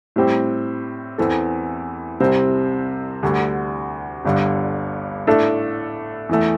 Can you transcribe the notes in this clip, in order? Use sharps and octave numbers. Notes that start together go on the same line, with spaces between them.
A2 G3 C4 G4
E2 E3 C4 A4
C2 C3 G3 C4
D2 D3 G3
G1 G2 D3
A2 A3 D4 A4
E2 E3 A3